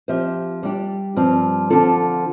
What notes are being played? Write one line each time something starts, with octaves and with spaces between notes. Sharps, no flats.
F3 C4 G4 C5 E5
G3 D4 G4
G2 F3 C4
D3 F3 C4 F4 A4